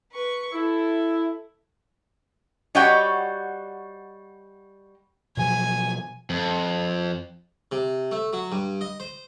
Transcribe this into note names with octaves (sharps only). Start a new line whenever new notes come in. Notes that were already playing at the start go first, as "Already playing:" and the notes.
B4 C#6
E4 A4
G3 F#4 C#5 D#5 F#5 G5
B2 F3 F#3 G#5
F2
C3
A3
F#3
G2
D#5
C5